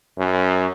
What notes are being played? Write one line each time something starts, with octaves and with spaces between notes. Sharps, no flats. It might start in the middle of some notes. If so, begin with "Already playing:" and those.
F#2